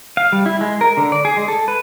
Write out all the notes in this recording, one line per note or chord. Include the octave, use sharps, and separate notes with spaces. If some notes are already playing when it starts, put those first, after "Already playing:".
F5
G3
E4
G#3
A#4
D3
D5
G#4
G#3
A4
B4